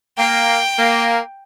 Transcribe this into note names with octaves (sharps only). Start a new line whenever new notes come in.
A#3 G5
A#3